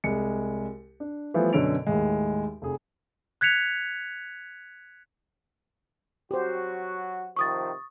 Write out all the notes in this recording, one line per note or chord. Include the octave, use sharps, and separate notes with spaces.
C2 G#3 C#7
D4
E3 F3 G3 A3 B3
F#2 B2 D3 C#5 D7 F7
D#2 A2 G#3
F1 G#4
F#6 G#6 B6 C#7 F7
F#3 F#4 G4 C5
C3 D#3 F3 C#6 D#6 A6